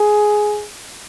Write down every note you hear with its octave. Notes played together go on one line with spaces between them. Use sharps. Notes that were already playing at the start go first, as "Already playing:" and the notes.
Already playing: G#4